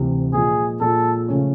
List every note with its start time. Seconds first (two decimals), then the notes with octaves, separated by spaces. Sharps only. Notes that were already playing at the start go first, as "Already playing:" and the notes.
Already playing: D2 C3 E3
0.33 A#2 F3 G#3 G#4
0.81 A#2 F3 G#3 A4
1.28 C#3 F3 A3 C#4